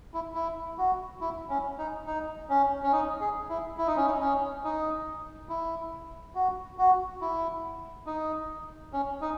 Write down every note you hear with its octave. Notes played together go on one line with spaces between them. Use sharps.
E4
E4
F#4
E4
C#4
D#4
D#4
C#4
C#4
D#4
G#4
E4
E4
D#4
C#4
D#4
C#4
D#4
E4
F#4
F#4
E4
D#4
C#4
D#4